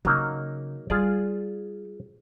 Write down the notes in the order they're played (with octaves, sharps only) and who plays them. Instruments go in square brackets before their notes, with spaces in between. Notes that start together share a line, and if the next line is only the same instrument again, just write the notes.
[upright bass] C#3 [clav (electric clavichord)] F#3 A#3 D#4
[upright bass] G3 [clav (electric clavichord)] F4 G#4 D5